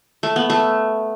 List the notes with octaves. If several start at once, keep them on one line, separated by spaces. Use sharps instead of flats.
A3
B3
A3